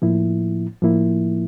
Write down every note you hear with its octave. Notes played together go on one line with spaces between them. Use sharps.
A2 F3 A#3 E4
A2 F3 A#3 E4